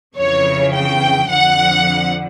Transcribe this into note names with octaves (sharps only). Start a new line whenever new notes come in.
F2 C#3 E3 C#5
G5
F2 D3 F3 F#5